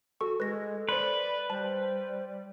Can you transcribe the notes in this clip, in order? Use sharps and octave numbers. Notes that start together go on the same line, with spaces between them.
F#4 A4 C#6
G#3 A4 B4 A#6
B4 C5 D5 C6
G3 C5 A5